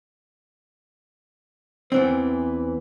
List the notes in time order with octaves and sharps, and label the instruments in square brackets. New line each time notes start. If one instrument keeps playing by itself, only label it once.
[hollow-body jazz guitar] E2 E3 C4 [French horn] B4